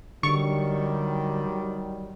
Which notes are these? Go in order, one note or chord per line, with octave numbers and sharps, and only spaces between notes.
D3 D#3 F#3 G3 C#6